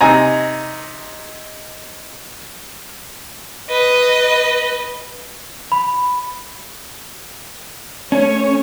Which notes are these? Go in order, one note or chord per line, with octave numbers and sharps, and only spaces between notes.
C3 D#4 G#5 A#5
B4 D#5
B5
A3 C#4 C#5